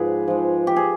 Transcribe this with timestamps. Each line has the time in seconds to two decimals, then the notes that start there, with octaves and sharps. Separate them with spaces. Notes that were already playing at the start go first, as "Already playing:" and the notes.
Already playing: G#2 F3 G#3 G#4 B4 D5
0.27 G#2 F3 G#3
0.67 G4
0.76 G#4